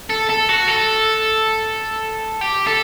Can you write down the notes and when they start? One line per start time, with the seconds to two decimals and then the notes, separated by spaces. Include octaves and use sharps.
0.10 A4
0.29 A4
0.49 F#4
0.68 A4
2.41 G4
2.67 A4